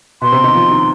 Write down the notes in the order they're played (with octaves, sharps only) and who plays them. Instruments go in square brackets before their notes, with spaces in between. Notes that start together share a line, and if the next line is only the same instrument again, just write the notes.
[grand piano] B2 B3 [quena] C6
[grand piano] C3 C4
D#3 D#4
F3 F4
D#3 D#4